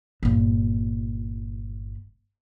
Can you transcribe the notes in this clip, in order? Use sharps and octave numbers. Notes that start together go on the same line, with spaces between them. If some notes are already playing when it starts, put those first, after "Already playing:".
G1 A#2